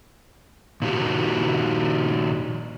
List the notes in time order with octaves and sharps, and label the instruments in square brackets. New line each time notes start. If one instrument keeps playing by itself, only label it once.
[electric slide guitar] A#2 D#3 F#4 G4